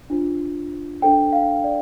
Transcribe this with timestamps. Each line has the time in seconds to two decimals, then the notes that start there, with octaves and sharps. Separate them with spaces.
0.10 D4 F4 C5
1.02 D4 A4 C5 G5
1.33 F5
1.64 D5